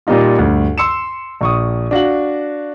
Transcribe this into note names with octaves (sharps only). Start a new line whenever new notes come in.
A#2 G3 A#3 D#4 F4
D2 G2
C6 E6 C#7 E7
A#1 C#6 D#6
D4 F#4 F5 F#7